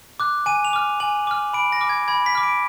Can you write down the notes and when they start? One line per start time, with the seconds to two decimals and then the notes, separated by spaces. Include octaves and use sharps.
0.20 D6 F#6
0.46 G#5 D#7
0.65 F7
0.73 D6 F6
1.00 G#5 F#7
1.27 D6 F6
1.53 B5 D7
1.72 A#6
1.81 D6 F6
1.89 G#6
2.08 B5 G#6
2.26 B6
2.35 D6 F6
2.43 D7